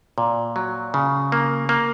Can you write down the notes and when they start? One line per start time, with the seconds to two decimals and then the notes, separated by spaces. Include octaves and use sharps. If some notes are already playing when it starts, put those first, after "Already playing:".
0.18 A#2
0.56 F#3
0.94 C#3
1.32 A#3
1.69 A#3